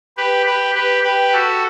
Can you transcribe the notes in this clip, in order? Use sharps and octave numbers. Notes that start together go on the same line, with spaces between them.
G4 B4
G4 B4
G4 B4
G4 B4
F#4 A4